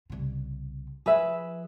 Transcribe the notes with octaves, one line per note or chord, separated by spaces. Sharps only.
C2 C#3
F3 G#4 B4 E5